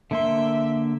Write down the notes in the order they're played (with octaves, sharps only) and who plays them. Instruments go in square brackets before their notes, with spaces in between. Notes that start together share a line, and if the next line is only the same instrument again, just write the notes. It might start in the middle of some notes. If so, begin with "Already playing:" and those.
[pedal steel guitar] D3 A#3 C6 [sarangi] E5